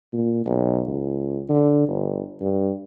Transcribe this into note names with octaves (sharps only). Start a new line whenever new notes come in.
A#2
B1
C#2
D3
G1
G2